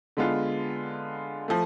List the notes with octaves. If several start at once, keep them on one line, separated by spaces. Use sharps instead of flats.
D3 G#3 B3 F4
F3 A3